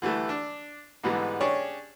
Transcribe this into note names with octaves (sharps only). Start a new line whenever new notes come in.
D3 E3 G3 A3
D4
G#2 D3 E3 G3 G#3 B3
C#4 D4 G4 G#4 C#5 D5